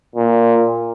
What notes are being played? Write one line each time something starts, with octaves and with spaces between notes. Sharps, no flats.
A#2